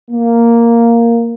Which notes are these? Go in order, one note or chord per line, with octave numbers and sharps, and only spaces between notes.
A#3